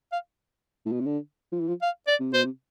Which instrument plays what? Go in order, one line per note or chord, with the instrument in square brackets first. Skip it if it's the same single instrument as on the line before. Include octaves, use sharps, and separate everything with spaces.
[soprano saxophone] F5
[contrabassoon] A2
B2
C3
D3
F3
E3
F3
[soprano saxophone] F5
D5
[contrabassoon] C3
[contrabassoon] B2 [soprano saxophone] C5
[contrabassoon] C3